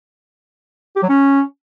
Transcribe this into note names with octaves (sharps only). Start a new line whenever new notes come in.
G4
F#3
C#4